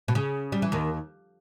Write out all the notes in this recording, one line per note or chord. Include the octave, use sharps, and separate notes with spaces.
B2
C#3
G3
E3
D#2 D#3